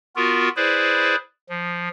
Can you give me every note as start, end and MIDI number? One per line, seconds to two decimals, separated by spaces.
0.16 0.49 59
0.16 0.49 65
0.16 0.49 66
0.16 0.49 70
0.56 1.16 64
0.56 1.16 68
0.56 1.16 71
0.56 1.16 72
0.56 1.16 74
1.49 1.89 53